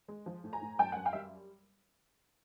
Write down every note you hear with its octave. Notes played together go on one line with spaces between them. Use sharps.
G#3
F3
A2
G#5 A#5
A2
F#2 G5 A5
F#2 F#5 G#5
F5 G5
G3 E5